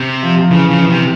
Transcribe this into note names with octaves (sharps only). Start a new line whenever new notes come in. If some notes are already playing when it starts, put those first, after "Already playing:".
Already playing: C3
F3
F3
C#3 E3
C#3 F3
E3
C3